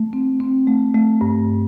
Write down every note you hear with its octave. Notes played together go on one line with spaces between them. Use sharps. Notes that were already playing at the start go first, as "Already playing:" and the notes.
Already playing: A3
C4
C4
A3
A3
G2